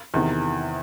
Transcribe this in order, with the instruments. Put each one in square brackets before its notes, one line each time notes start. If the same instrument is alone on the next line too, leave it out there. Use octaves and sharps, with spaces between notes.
[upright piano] E2 C3 D#3